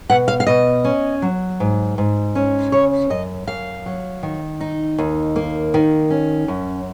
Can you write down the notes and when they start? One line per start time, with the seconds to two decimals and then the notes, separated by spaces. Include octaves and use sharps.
0.10 B2 F#5
0.28 F5
0.40 F5
0.47 B2 D#5
0.84 C#4
1.22 F#3
1.60 G#2
1.98 G#2
2.35 C#4
2.72 C#3 C#5
3.10 F#2 D#5
3.47 F#2 F5
3.86 F#3
4.23 D#3
4.61 D#4
4.98 D#2
5.36 A#3
5.74 D#3
6.10 C#4
6.48 F#2